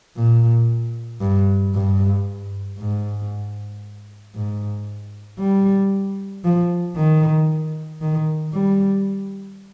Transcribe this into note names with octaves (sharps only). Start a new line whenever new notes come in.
A#2
G2
G2
G#2
G#2
G3
F3
D#3
D#3
G3